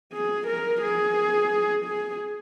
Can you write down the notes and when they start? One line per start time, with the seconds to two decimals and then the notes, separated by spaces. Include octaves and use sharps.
0.13 G#4
0.47 A#4
0.81 G#4
1.85 G#4